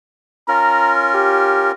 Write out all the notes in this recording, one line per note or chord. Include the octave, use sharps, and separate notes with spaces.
C#4 F4 A#4 A#5
G4